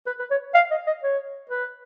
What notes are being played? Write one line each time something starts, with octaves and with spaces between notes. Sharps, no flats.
B4
B4
C#5
F5
D#5
D#5
C#5
B4